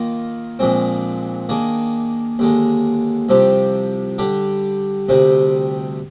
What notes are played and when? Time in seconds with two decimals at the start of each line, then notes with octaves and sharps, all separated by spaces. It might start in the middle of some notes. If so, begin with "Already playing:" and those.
Already playing: D#3 A#3 F4 A#4
0.59 A#1 A#2 G#3 C4
1.49 D#3 A#3 D4 G#4
2.39 D#2 D3 G#3
3.29 C2 C3 F3 C4 G4
4.18 D3 G3 D4 G4
5.09 D2 C3 G3 C4 D#4